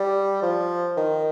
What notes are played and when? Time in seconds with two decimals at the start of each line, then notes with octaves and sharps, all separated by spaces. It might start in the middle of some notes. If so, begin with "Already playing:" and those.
Already playing: G3
0.42 F3
0.97 D#3